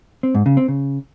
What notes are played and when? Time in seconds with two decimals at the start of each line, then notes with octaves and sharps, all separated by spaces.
0.23 C4
0.35 G#2
0.46 C#3
0.57 C4
0.68 C#3